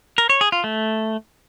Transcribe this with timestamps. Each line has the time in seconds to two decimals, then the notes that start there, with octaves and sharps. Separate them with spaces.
0.18 A#4
0.30 C#5
0.41 G#4
0.52 F4
0.64 A3